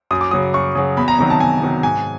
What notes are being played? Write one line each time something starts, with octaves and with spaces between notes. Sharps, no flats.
F#2 D#6
D6
C#3 F#3 D#6
F#2 C#6
C#3 F#3
E2 B5
A#5
C3 D#3 F#3 A#5
A5
E2 G#5
C3 D#3 F#3
G#2 G#5